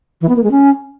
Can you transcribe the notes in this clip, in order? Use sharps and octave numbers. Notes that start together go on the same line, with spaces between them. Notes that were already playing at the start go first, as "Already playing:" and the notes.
E3
B3
A#3
G#3
C#4